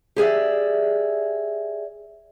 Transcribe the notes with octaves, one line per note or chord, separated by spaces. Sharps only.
G4 G#4 D5 E5